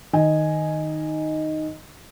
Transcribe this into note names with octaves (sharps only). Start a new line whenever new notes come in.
D#3 D#5 G#5